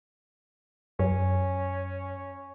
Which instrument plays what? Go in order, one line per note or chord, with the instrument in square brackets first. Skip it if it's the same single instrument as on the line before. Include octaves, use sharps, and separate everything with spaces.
[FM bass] F#2 [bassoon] C#4